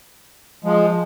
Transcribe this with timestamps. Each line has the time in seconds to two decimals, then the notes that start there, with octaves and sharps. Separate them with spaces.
0.64 F3 G#3